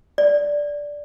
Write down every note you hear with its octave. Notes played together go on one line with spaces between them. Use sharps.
D5